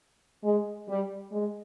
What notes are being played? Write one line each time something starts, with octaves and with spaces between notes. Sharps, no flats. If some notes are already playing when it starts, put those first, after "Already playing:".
G#3
G3
G#3